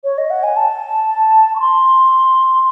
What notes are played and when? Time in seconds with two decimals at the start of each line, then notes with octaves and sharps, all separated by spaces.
0.04 C#5
0.18 D#5
0.30 F#5
0.43 G#5
0.56 A5
1.56 C#6
1.60 C6